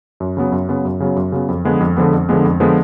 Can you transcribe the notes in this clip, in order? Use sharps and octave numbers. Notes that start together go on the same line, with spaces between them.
F#2
C#3 F#3 B3
F#2
C#3 F#3 B3
F#2
C#3 F#3 B3
F#2
C#3 F#3 B3
F2
D3 F3 G#3 B3
F2
D3 F3 G#3 B3
F2
D3 F3 G#3 B3
F2
D3 F3 G#3 B3